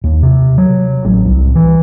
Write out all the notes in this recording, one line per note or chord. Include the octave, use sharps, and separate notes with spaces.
D#2
C3
F#3
A1
C2
E3